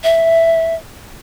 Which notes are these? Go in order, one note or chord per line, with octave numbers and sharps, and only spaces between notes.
E5